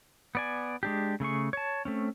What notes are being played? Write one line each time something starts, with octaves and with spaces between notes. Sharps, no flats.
B3 D5 G#5
G#3 D4 G4
C#3 A3 G#4 C#6
C#5 A5
A3 C4 C#4